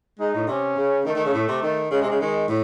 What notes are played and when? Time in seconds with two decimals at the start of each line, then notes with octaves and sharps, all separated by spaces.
0.19 G#3 D#4
0.34 A2
0.48 C3 C#4
0.76 C#3
1.05 D#3 A3
1.15 D#3
1.25 C#3
1.34 A2
1.48 C3
1.63 D#3
1.91 C#3 G#3
2.01 C3
2.10 C#3
2.20 D#3 G#3
2.48 A2